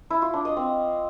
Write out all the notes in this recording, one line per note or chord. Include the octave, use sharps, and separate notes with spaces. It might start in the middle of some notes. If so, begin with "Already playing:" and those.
E4
F4
D4
D#5
C4